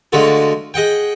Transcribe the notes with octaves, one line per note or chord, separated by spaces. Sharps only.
D3 G#3 A3 F4 F#4
G#4 D#5 F#5 G5